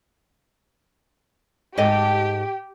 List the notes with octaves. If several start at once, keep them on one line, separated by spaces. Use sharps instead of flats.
G#2 G4 A4 D#5